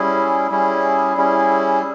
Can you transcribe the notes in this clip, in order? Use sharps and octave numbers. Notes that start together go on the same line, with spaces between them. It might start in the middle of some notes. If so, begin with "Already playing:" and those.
Already playing: G3 C#4 E4 G#4
G3 C#4 E4 G#4
G3 C#4 E4 G#4